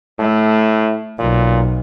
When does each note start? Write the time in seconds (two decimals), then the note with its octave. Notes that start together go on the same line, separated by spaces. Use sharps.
0.19 A2 A3
1.19 B1 A#2